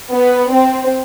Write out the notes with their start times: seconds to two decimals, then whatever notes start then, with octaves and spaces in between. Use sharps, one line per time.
0.11 B3
0.51 C4